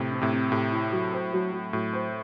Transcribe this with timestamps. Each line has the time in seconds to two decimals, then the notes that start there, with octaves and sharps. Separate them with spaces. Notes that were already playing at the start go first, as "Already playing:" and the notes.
Already playing: A2 C3
0.12 C4
0.21 A2 C3
0.32 C4
0.52 A2 G4
0.72 E4
0.92 F#3
1.13 C5
1.33 F#3
1.53 F#3
1.73 A2 F#3
1.93 C5